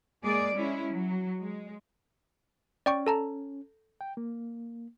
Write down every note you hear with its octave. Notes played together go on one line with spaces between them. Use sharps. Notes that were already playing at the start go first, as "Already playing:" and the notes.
G#3 A#3 G#4 D5
G#3 C#4 E4
F#3
G#3
C#4 D5 G5 C#6
A4 A5 A#5
G5
A#3